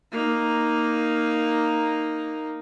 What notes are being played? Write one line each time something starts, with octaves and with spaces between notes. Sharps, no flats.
A#3 D#4